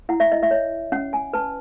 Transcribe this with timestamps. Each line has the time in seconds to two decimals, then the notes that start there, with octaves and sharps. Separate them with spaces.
0.09 E4 F#5
0.20 E5
0.32 D#5
0.42 E5
0.51 C#5
0.92 C#4 F#5
1.13 G#5
1.33 B4 A5